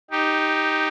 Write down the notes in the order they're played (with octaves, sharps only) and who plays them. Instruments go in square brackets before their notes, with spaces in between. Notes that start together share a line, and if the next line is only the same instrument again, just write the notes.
[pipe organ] D#4 G4